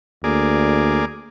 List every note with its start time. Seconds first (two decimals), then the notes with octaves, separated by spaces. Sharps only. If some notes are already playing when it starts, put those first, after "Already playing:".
0.24 D2 A#3 G#4 D5